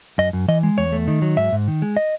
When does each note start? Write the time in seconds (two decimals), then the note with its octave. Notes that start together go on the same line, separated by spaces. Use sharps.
0.18 F#2 D#5
0.33 F#2
0.48 E3 D#5
0.63 G#3
0.78 E2 C#5
0.92 A3
1.08 D#3
1.22 F#3
1.37 G#2 E5
1.52 G#2
1.68 D#3
1.82 G#3
1.97 D#5